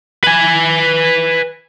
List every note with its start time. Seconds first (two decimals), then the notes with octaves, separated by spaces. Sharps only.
0.24 B4 G#5